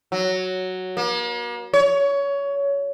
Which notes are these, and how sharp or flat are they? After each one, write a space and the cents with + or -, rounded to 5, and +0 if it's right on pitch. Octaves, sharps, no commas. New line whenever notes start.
F#3 +0
A#3 +40
C#5 +20